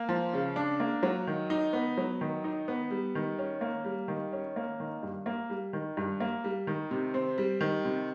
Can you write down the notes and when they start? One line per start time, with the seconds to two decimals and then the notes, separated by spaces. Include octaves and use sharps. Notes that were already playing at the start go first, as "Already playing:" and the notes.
Already playing: A#3
0.09 F3
0.33 C#3
0.56 D4
0.80 A#3
1.03 F#3
1.27 D#3
1.50 D#4
1.73 B3
1.97 F#3
2.21 D#3
2.44 D#4
2.68 B3
2.91 G3
3.15 D#3
3.39 C#4
3.61 A#3
3.85 G3
4.08 D#3
4.33 C#4
4.56 A#3
4.80 D#3
5.03 G2
5.26 A#3
5.50 G3
5.73 D#3
5.97 G2
6.20 A#3
6.44 G3
6.67 D#3
6.91 C3
7.14 C4
7.38 G3
7.61 D#3
7.85 C3